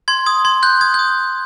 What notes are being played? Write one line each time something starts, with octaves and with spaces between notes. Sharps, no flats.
C6 G#6
D#6 G#6
C6 G#6
F#6 G6
D#6 G#6
D#6 G6